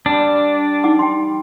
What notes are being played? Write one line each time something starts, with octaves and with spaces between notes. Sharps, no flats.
G3 D4
D#4 F#5 D6
G5 C6